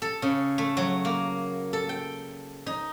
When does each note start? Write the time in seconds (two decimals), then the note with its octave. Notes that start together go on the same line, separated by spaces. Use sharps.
0.02 A4
0.22 C#3
0.58 A3
0.77 F#3
1.05 A#3
1.73 A4
1.89 G5
2.66 D#4